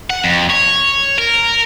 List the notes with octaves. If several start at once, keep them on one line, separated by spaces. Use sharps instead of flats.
F#5
F2
C#5
A#4